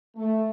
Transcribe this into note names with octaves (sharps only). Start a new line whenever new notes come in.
A3